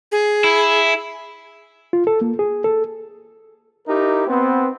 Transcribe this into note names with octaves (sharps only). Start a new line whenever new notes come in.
G#4
E4
F4
A4
A#3
G#4
A4
D#4 E4 G4 A#4
B3 C4